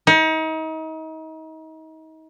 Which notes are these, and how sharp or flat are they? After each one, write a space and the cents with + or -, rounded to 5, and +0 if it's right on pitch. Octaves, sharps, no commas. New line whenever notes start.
D#4 +35